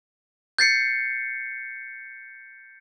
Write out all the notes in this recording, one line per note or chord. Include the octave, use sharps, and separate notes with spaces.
G6 A6 C7 C#7